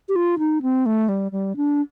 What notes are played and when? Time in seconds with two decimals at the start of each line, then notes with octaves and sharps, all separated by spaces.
0.09 G4
0.16 F4
0.39 D#4
0.62 C4
0.86 A3
1.09 G3
1.32 G3
1.56 D4